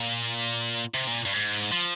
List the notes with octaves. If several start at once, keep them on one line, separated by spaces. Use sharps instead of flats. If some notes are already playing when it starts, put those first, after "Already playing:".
Already playing: A#2
C3
A#2
G2
G#2
F3